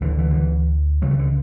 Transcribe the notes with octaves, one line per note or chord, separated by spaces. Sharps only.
D2 D3 E3
E3
D3
E3
C#2 C#3 F#3
E3
D3